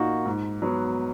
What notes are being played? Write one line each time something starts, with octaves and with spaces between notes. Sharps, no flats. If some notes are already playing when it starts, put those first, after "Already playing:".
Already playing: A#2 A#3 D#4 F#4
G#2
F#3 B3